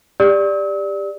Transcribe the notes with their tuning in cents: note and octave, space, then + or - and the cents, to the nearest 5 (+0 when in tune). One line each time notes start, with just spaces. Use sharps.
G4 +25 D5 +0 E6 -45